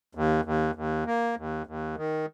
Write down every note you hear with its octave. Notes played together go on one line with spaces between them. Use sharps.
D#2
D#2
D#2
A#3
D#2
D#2
D#3